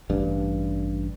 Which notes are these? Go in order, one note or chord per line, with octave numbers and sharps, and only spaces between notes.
A1 G2